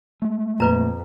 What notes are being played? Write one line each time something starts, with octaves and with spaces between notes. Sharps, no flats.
G#3 A3
F2 A#2 F4 B4 A#5